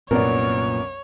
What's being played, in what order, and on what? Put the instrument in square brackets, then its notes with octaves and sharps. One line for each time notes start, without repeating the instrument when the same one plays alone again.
[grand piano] C2 F#2 B3 [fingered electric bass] A#2 [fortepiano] A#4 D5 [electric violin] C#5